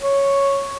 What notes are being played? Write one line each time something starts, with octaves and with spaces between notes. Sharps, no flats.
C#5